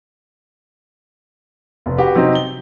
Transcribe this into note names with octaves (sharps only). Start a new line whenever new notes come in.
F1
F#4 G4 B4
C3 F#3 D#4 C5
G7